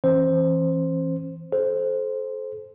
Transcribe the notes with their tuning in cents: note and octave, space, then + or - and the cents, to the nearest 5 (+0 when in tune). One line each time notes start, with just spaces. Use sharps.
E3 +0 C#4 -45 C5 +0
A4 -30 C5 +0